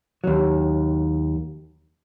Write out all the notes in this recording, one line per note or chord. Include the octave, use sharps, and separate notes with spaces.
D#2 F#3